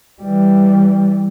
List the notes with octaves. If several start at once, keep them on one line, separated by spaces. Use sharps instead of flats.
E3 G3